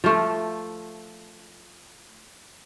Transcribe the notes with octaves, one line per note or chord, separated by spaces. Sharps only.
F3 A3